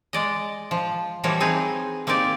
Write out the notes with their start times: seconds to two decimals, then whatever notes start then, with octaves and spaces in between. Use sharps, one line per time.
0.13 G#3 D5 D#5
0.71 F3
1.24 E3 F3 G3 A#3 F#4 C#5
1.40 C4 D#4 G#4 B4
2.07 A#3 C4 D#4 G4 D5